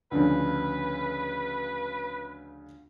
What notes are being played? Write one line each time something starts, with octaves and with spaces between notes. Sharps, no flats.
D2 C#3 F3 B4